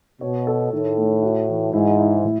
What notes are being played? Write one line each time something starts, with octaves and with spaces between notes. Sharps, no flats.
B2 C#5
A4
A2 D#3
A3
F#4
E3
G#2 E4
E4
A2